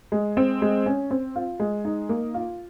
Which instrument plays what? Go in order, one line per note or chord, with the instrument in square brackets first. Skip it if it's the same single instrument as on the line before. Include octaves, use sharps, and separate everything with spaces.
[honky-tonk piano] G#3
C4
G#3
C#4
C4
F4
G#3
D#4
A#3
F4